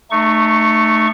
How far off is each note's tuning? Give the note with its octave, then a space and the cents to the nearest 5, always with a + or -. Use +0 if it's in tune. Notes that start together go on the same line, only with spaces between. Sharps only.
A3 +0 D#4 -30 C#6 +0